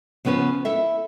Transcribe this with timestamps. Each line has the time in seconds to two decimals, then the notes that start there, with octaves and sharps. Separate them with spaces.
0.25 C#3 F3 B3 C#4 B4
0.65 E4 A4 E5